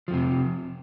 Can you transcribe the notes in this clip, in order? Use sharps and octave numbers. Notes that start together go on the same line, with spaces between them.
F2 C3 F3